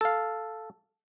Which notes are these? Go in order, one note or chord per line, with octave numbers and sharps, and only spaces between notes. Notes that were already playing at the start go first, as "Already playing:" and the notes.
A4 F5